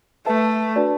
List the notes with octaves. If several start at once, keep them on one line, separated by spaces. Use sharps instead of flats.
A3 B4 E5 A5
D4 F#4 B4 D5 A5